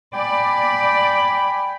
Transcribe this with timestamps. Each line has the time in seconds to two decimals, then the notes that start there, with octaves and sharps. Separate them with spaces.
0.14 D5 G5 G#5 B5